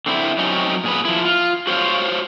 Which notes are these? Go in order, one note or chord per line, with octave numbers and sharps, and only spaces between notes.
D3 C4 E4
F#3 C4 C#4 D#4
A#2 G#4 B4
F3 E4
F4
F#4 C5 C#5 F5